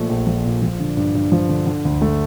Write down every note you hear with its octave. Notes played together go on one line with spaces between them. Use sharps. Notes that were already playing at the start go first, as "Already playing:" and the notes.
Already playing: A#2 F3 A3
A#1
F3
A#2
F3
D3
G2
G2
F3
D3
D3
D2
A3